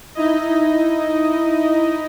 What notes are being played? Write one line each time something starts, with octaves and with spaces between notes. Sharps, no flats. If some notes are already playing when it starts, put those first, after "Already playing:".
D#4 E4 D#5